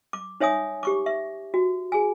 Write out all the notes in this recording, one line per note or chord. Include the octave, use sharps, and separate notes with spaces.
D6
D#4 C#5 E5 G#5 D#6
G4 C#6 D6
E5
F#4
G#4 G#5